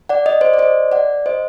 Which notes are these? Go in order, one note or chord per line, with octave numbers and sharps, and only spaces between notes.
D5 F#5
D#5
D5
C5 D#5
D5
C5 D#5
D5 F#5
C5 D#5